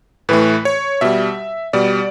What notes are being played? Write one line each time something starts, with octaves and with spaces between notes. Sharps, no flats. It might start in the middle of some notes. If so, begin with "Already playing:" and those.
A2 E3 A3 B4
C#5
B2 G3 E5
B2 G3 D5